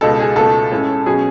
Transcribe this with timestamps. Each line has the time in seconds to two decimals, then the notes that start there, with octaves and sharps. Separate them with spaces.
0.01 C#2 B2 G#3 D#4 A4
0.20 G#4
0.36 C#2 B2 A3 A4
0.71 A2 G#3 C#4
1.06 B2 F#3 C#4 G#4